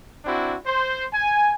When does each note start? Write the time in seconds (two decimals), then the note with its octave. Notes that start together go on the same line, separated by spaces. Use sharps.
0.25 C4 D4 E4 F#4
0.65 C5
1.13 G#5